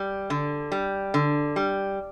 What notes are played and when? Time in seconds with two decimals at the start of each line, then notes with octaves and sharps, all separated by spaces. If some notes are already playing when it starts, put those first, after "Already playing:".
Already playing: G3
0.30 D3
0.72 G3
1.14 D3
1.56 G3